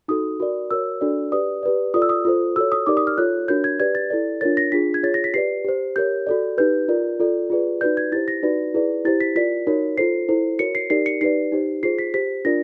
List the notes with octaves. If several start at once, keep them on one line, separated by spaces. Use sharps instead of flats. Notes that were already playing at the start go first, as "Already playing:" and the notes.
D#4 F#4 A4 D#6
F#4 A#4 D5
F#4 A#4 C#5 E6
D4 F#4 A4 D5
G4 B4 D5 D#6
G4 B4 D5
F4 A4 D5 D#6
E6
D#6
F4 A4 C5
F#4 A4 C#5 E6
D#6
D#4 G4 A#4 D5 D6
D#6
F6
F4 A4 C#5 F#6
D4 F#4 A#4 C#5 G6
G#6
G4 B4 D5 G#6
A6
E4 A4 D5
D4 F4 A#4 C#5 A6
A#6
D4 F4 G#4 B6
G#6
F4 G#4 C#5 A6
A#6
B6
G4 B4 D5 C7
G4 C5
G4 A#4 C#5 G6
F#4 A4 D5
D#4 G4 B4 G6
F4 A#4 D5
F4 A4 D5
F4 G#4 B4 D5
D#4 F#4 B4 D5 G6
G#6
E4 G4 C5 A6
A#6
D#4 F#4 B4 D5
E4 G#4 B4 D5
E4 G4 C5 A6
B6
F4 A#4 D5 B6
D#4 F#4 A#4 C#5
F4 A4 C5 C7
E4 A4 C5
F#4 A#4 C#5 C#7
C7
D#4 G4 A#4 D5 C7
C#7
D#4 G4 B4 D5 C7
D#4 G4 C5
F4 G#4 C5 C7
B6
G4 C5 B6
D4 F4 A#4 D5 A#6